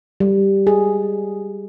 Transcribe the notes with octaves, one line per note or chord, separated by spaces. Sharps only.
G3
G#4